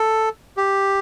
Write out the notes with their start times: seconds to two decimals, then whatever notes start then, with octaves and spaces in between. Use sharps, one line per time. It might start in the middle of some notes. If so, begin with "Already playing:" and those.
Already playing: A4
0.57 G4